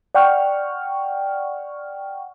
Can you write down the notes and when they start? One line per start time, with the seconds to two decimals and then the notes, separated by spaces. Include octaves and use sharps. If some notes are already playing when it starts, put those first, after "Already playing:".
0.15 D5 F#5 G5 C#6 F6